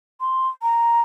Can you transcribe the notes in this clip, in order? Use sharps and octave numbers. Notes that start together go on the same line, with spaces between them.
C6
A#5